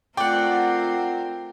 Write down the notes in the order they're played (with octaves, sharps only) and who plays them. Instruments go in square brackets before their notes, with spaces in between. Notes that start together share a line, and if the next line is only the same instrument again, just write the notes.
[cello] A3 A#4 [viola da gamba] C4 F4 [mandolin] D5 F#5 [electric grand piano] G5